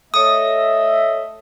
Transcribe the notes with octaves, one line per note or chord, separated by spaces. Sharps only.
A3 A4 C#5 D#5 E5 D#6